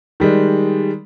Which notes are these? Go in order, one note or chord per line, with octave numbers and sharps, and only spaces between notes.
D#3 G3 G#3